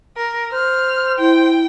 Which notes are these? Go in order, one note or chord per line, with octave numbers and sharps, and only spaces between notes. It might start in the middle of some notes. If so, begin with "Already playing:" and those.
A#4
C5 F6
E4 G5